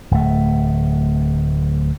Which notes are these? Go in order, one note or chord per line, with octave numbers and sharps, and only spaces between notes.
D1 A3